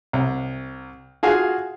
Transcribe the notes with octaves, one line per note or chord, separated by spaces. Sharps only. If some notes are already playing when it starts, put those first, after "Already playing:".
C2
F4 F#4 G#4 F5